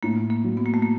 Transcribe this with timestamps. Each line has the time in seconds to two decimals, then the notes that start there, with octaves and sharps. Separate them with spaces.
0.03 A2 A#3
0.30 A#3
0.44 F#3
0.57 B3
0.66 A#3
0.74 A3
0.82 A#3